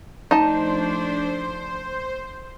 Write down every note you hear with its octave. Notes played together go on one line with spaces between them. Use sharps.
F3 A3 D4 D#4 C5 A5